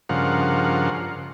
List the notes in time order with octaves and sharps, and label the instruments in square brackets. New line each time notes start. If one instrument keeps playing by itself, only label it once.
[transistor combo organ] G2 C#3 F3 A#4 F5 F#5